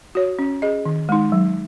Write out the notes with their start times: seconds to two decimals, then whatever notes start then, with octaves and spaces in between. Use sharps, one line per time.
0.15 F#4 C#5
0.39 C#4
0.62 G#4 D#5
0.85 D#3
1.09 G#3 D#4
1.32 F#3